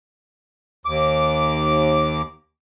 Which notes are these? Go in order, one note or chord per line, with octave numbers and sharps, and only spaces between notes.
D#2 D6